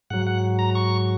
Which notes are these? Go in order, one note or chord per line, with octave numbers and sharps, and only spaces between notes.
G#2 F#3 F#5
F#5
A#5
C#6